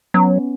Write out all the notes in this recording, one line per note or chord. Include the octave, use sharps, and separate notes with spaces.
F#3 B3 C#4